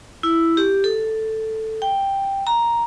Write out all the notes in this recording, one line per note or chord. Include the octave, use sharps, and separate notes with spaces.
E4
G4
A4
G5
A#5